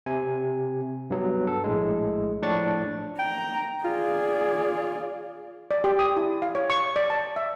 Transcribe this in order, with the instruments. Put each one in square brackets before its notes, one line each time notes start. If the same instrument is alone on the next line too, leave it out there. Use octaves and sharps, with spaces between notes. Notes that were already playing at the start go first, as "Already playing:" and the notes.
[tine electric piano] C3 G#5
G2 F#3 B3
A4
A#1 A2 G#3
A2 F3 D4 C#6 A6
[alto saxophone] G5 [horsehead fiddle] A#5
[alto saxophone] F4 [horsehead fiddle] G#4 D5
[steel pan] D5
G4
D#6
E4
F5
C#5
C#6
D5
A5
E5